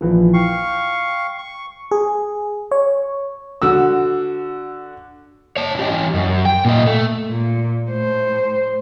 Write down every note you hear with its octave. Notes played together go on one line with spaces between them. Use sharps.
A#1 E3 F3
F5 G5 C#6
C#6
G#4
C#5
D3 F#4 E6
C#5 A5
E3 G4
F#2
G5
A#2 D#5
A3
A#2
A2 C5